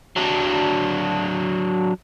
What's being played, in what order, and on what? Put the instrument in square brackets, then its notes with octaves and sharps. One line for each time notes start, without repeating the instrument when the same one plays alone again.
[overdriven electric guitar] F#3 D4